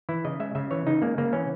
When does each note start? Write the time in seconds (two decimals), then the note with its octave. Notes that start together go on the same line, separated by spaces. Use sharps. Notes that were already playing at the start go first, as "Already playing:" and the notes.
0.09 E3 E4
0.24 C#3 D#5
0.40 G#3 E5
0.55 C#3 E5
0.71 E3 C#5
0.87 C#3 D#4
1.02 G#3 A#3
1.18 C#3 A#3
1.33 E3 C#4